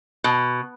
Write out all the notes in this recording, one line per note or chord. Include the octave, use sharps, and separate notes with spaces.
B2